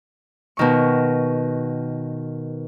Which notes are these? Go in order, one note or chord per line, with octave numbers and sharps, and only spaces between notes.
B2 D#3 C#6